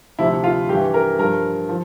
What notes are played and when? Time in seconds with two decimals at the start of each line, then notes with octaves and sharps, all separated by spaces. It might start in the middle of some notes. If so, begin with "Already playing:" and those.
0.19 D2 C3 F3 E4
0.44 F4
0.69 G2 G4
0.74 E3
0.94 A#4
1.18 G2 F3 A#4
1.69 F3